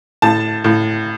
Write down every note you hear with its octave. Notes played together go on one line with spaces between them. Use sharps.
A2 A5
A2